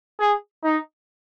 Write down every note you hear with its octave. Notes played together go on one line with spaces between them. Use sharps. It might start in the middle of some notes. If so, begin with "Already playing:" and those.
G#4
D#4